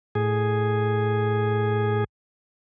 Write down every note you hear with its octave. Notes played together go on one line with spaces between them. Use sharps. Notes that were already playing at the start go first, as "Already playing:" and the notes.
A2 G#4